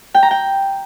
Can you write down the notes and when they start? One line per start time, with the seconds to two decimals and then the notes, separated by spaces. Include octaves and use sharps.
0.14 G5
0.23 A#5
0.31 G5